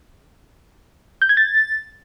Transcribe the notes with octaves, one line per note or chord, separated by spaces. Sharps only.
G6
G#6
A6